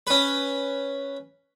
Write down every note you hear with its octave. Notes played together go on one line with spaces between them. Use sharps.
C#4 B4